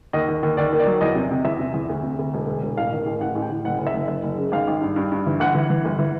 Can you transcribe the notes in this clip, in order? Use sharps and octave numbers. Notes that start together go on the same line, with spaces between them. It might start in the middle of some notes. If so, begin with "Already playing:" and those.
D#2 D#5
D#2
D#2
D#2 D5
D#3
D5
F#3
E2 D#5
C3
C3
E2 E5
C3
E2
D2
C3
D2
E1
D2
E1
A1 F5
D#3
A1
A1 F#5
A1
G5
A1
F#1 F#5
F#1
E5
F#1
F#1 E5
F#1
C#3
G#1 F5
G#1
G2
G2
G2
E3
G1 F#5
E3
E3
G1
E3